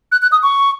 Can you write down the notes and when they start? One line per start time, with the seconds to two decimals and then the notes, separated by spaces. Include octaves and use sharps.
0.12 F#6
0.22 F#6
0.32 D#6
0.43 C#6